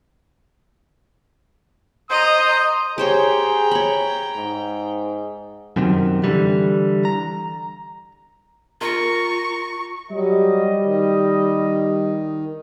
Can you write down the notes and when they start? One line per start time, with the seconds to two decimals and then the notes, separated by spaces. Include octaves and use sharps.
2.10 C5 D#5 A#5 C6 D#6
2.98 G4 G#4 C5 C#5 G5 A#5
3.71 C#5 B5
4.36 G#2
5.76 F#2 C3 D#3
6.24 D3 E3 G3
7.05 A#5
8.81 F4 A#4 A#5 C#6
10.11 F#3 G3 D#5
10.83 D#3